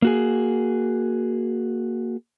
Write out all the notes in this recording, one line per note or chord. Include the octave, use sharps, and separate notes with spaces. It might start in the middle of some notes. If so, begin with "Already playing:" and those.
A#3 F#4 G#4